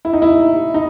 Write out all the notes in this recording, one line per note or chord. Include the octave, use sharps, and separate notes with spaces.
E4
D#4
E4
D#4